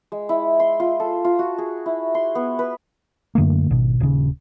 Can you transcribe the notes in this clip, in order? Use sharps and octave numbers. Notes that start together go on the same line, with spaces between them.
G#3
E4
C6
F4
A4
F4
F#4
G#4
E4
C6
B3
B4
F#2 D3 A3 A#3
G#1 B2
D#1 C#3